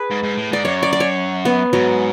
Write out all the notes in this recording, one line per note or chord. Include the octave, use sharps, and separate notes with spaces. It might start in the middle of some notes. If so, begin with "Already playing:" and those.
Already playing: G#4 B4
G#2
G#2
A2
G#2 D5
F#2 C#5
D5
D5
C#5
B3
G#2 F#3